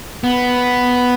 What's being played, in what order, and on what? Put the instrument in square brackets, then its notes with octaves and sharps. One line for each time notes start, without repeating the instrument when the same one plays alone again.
[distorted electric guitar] B3